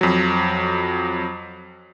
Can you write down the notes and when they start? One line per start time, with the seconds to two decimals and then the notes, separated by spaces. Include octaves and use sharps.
0.01 F2 F#3